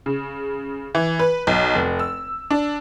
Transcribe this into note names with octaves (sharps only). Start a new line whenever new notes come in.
C#3
E3
B4
B1
F1
E6
D4